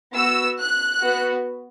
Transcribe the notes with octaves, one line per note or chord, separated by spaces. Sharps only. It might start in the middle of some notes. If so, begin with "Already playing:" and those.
B3 F#4 E6
F#6
B3 F#4